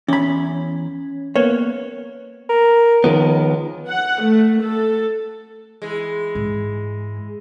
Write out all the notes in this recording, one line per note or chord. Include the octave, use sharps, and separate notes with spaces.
E2 C#4 B5
A#3 B3 C#5
A#4
C#2 D#3 F3 B3
F#5
A3
A4
E3 G#3
G#2